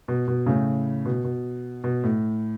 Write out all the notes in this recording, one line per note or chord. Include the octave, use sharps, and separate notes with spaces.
B2
B2
A2 C#3
B2
B2
B2
A2